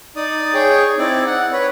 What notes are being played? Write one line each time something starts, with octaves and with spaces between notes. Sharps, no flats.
D#4 D5 D#6
G#4 C#5 G5
C4 D#4 E4 D5
F#5
B4 C#5